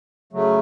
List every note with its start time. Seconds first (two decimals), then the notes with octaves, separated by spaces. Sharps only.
0.33 C#3 F#3 A3